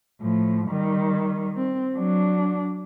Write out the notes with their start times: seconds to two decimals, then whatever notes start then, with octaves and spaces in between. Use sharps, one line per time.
0.21 A2 F3
0.68 D#3 G3
1.56 C4
1.95 F#3 D4